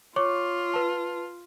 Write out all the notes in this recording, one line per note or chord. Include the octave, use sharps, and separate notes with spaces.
F4 C#5 C#6 D6
B4 A5